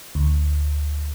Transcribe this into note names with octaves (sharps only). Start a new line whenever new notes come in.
D2